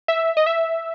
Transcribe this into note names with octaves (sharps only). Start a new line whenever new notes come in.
E5
D#5
E5